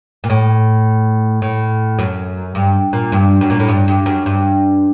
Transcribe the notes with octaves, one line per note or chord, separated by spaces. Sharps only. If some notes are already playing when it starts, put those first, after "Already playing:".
A#2
A2
A2
F#2
G2
A#2
G2
F#2
A#2
A2
G2
G2
F#2
G2